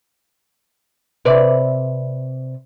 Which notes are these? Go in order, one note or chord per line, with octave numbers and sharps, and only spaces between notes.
C3 B4 D5